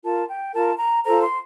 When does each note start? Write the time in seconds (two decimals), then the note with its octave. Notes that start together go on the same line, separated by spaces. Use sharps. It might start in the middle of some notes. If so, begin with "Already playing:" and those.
0.04 F4 A#4 A5
0.29 G5
0.54 F4 A#4 A5
0.79 A#5
1.05 F4 A4 C5 A#5
1.22 C6